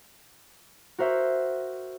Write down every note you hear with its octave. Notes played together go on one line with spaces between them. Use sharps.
F#4 A#4 C5 E5